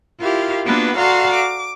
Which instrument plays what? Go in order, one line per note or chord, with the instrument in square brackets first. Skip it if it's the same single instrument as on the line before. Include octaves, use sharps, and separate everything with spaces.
[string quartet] E4 F4 G4 A#4 F5
A#3 B3 D4 F4 F#4 B4
F#4 A4 D5 F5 A#5 C6
D6